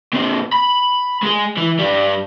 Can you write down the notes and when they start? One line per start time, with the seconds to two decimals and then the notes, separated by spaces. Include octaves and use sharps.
0.13 A#2 C4
0.53 B5
1.23 G#3 G#4
1.57 E3
1.79 G2 G3